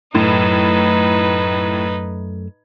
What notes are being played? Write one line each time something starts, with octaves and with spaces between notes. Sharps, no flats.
F#2 A2 A3 D#4 B4